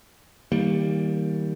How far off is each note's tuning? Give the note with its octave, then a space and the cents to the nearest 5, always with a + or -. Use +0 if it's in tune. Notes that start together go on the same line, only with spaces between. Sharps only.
D#3 +40 G3 +0 A#3 +0